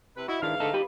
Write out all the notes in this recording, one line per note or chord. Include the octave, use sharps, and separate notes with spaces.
C3 E4 B4
E4 F#4 D#5
G#2 D#3 E3 D4 E4 F5
D3 A3 D#4 A4
F4 G4 B4